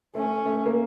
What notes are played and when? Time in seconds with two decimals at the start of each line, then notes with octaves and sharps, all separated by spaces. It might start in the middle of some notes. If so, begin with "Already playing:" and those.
0.15 A3 C#4
0.46 A3
0.66 A#3